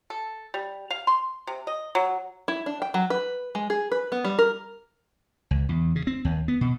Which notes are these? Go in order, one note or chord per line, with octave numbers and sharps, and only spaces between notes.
A4
G3
F5
C6
C3
D#5
F#3
E4
D4
G5
F#3
B4
G#3
G#4
B4
B3
G3
A#4
C#2
E2
C#3
C4
D#2
B3
B2